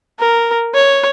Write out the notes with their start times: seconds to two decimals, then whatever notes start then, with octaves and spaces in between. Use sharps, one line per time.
0.19 A#4
0.75 C#5